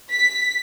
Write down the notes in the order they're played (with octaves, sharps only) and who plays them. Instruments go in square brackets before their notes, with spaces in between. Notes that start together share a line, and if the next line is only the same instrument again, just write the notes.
[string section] B6